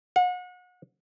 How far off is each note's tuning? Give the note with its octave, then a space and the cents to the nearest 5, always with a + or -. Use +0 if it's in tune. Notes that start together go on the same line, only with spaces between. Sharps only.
F#5 -35